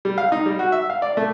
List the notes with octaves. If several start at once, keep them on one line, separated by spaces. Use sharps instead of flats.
G3
F5
D#4
G3
F#4
E5
F5
D5
A3